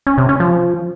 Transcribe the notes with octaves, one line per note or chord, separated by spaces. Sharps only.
C#4
C3
C#4
F3